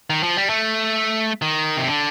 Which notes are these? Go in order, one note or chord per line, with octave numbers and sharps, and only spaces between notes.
D#3
F3
G3
A3
D#3
C3
D3